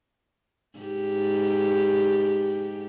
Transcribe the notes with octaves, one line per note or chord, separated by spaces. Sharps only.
G#2 G4